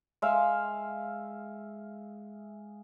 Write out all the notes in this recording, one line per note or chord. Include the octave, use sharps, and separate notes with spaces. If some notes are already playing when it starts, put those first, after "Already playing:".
G#3 E5 F5